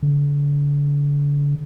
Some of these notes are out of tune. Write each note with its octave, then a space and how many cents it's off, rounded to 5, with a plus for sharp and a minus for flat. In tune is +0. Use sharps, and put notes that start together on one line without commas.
D3 -35